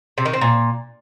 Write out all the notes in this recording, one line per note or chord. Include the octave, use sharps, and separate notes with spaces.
C3
D#3
C4
A#2